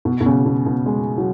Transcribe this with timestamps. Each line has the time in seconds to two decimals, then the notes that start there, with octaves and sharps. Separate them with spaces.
0.05 B2
0.21 B2
0.26 C#3
0.46 B2
0.66 B2
0.86 G#3
1.18 F#3